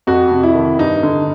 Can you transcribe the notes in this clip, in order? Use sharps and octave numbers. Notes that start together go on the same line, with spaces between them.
F2 F#4
C3
E4
D#3
G2 D#4
D3